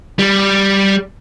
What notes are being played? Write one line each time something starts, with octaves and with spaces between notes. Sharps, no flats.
G3